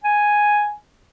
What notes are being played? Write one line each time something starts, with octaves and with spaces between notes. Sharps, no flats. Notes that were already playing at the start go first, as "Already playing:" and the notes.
G#5